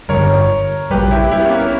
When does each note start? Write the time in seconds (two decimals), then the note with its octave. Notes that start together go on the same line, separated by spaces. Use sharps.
0.09 G2 D3 G3 A#4 C#5
0.91 A#1 A#2 G3 G4 B4
1.11 E4 G4
1.32 E4 G4
1.40 B3
1.45 A#3 C#4
1.59 A#3